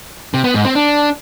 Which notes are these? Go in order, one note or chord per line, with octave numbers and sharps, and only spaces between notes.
C3
B3
G#2
C4
D4